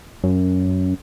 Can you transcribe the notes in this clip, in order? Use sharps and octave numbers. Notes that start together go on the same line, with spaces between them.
F#2